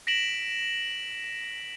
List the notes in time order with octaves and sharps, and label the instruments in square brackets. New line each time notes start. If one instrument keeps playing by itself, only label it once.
[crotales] A#6 B6 D7 E7 F#7